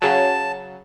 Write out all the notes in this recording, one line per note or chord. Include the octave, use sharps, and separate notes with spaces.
C#3 F#3 A5